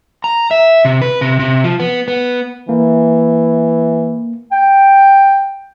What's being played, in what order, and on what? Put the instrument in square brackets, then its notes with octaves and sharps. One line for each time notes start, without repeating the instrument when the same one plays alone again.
[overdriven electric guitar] A#5
E5
C3
B4
C3
C3
F3
B3
B3
[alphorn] E3 [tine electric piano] A#3
[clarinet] G5